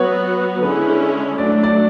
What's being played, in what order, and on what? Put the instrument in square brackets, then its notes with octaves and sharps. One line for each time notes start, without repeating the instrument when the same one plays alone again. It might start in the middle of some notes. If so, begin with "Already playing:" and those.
Already playing: [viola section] F#3 B3 F#4 [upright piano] C#5
[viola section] D3 G#3 C#4 E4 [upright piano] B4
[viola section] F#3 A3 D4 [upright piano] D5
[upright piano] D5
D5